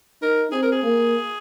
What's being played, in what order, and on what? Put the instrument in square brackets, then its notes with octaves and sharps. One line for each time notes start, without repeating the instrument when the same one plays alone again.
[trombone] D#4 [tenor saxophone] A#4
[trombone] C4 [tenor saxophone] G#4
[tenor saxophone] A#4
G#4
[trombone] A#3